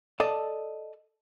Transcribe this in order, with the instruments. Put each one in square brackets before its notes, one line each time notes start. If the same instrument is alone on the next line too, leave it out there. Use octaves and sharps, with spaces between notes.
[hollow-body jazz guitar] A4 D5 D#5 A5